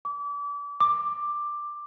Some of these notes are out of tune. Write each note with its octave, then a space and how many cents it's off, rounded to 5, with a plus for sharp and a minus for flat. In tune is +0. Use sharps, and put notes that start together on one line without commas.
D6 -35
D6 +10